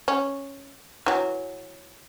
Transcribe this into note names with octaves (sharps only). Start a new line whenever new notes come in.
C#4
E3 F#3